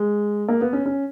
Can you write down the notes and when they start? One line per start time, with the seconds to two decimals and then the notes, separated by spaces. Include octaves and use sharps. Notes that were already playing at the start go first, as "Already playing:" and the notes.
Already playing: G#3
0.49 A#3
0.61 B3
0.73 C#4
0.86 C#4